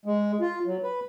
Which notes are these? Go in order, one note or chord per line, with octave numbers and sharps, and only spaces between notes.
G#3
F4
F#3
B4